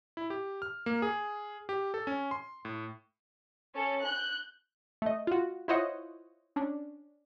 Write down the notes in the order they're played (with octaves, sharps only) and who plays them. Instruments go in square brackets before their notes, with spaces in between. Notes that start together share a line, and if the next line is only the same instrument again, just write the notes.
[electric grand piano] E4
G4
F6
A#3
G#4
G4
A4
C#4
C6
A2
[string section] C#4 A4
F#6 G6
[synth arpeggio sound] A3 D#5
F4 F#4
E4 F4 C5 C#5 D#5 F#5
C#4 D4